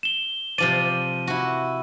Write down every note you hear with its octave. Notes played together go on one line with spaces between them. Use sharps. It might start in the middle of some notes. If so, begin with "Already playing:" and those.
E7 G7
C3 F3 D5 D#7
E4 F#4